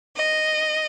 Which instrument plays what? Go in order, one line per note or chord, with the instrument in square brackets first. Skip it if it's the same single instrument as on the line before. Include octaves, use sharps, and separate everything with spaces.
[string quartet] D#5